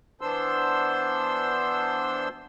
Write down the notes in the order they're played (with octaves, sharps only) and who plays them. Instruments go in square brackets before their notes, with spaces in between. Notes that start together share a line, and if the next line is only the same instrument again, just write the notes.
[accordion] E3 B3 D4 C5 C6 E6